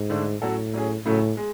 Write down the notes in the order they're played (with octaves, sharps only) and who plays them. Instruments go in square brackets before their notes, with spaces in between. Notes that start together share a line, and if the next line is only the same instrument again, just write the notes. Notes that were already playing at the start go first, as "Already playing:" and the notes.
Already playing: [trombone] G#2
[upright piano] D3 A3 D4
[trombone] A2 [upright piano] F#3 C#4 F#4 A4
[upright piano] F#3 C#4 G#4
[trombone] A2 [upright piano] C#3 F#3 A3
[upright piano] G#3